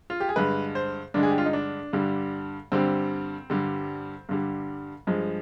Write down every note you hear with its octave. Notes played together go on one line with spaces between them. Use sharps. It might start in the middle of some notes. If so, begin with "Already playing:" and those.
F4
G4
G#4
G2 D3 G#3 B4
C5
G2 D3 G#3 D4
G#4
G4
F4
D#4
D4
G2 D3 G3
G2 D3 G3 C4
G2 D3 G3
G2 D3 G3
G2 F3 G#3